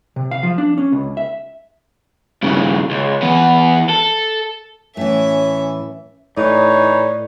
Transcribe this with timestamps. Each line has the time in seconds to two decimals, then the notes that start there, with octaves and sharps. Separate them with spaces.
0.16 C3
0.31 F5
0.43 F3
0.58 D4
0.78 C#4
0.92 C#2
1.17 E5
2.43 G2 C#3
2.91 C#2
3.22 E2 B3
3.90 A4
4.97 A2 E3 C#4 E5
6.37 A2 E3 D#4 C#5 D5